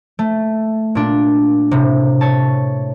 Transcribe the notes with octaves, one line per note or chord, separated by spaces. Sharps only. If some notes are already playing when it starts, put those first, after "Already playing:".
A3
A#2 D4
A2 C3
C#5 A5